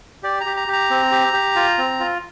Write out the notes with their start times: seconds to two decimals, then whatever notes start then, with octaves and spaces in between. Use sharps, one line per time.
0.23 G4 D5
0.41 A#5
0.46 G4
0.57 A#5
0.68 G4
0.73 A#5
0.90 C4
1.12 G4
1.33 G4
1.56 F4
1.78 C4
2.00 F4